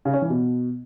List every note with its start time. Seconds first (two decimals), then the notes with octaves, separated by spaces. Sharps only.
0.05 C#3
0.14 C#4
0.22 E3
0.30 B2